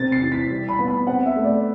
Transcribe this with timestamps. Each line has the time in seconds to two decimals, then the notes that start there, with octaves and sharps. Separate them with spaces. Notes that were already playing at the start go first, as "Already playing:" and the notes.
Already playing: C3 C4 A6
0.12 C7
0.22 E3
0.32 B6
0.50 G3
0.68 B5
0.79 B3
0.88 B5
1.07 C4 F#5
1.26 E5
1.36 A3
1.44 D5